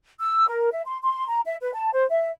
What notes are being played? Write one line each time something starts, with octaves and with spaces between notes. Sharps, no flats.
E6
A#4
E5
C6
C6
A#5
E5
B4
A5
C5
E5